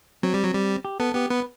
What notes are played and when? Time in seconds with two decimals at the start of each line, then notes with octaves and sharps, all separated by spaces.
0.23 F#3 C4
0.34 G3
0.44 F#3
0.54 G3
0.85 G4
1.00 B3 A4
1.15 B3 G4
1.30 B3 B4